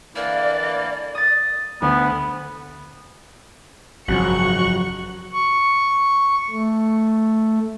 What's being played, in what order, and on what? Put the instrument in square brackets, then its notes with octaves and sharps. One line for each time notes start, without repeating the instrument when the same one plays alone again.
[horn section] D3 E3 A#3 [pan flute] D5
[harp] D#6 A6
[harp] D2 [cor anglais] B3
[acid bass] G#1 [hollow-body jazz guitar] F#2 C#3 F3 [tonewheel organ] F#4 F#6 [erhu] C#6
[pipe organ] C#6
A3